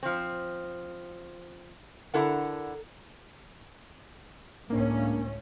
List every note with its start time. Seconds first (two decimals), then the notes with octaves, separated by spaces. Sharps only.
0.03 F3 C4
2.14 D3 E4 A4 A#4 F#5
4.70 C#2 A2 A#3 C#4 D4